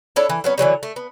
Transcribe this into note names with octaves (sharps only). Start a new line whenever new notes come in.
D4 E4 A4 C#5
E3
F#3 B3 C#4
D3 E3 F#3 G3
A3
B3